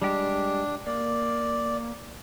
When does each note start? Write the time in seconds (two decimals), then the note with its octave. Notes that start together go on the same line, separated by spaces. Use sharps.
0.02 G3 G#3 D4 G4
0.86 A#3 D5